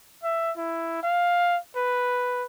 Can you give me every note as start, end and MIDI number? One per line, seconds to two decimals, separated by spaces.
0.23 0.51 76
0.57 1.03 64
1.03 1.58 77
1.76 2.44 71